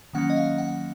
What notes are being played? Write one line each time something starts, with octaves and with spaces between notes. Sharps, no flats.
D#3 F#3 A#3 C#4 F#5
D#5
F5
F#5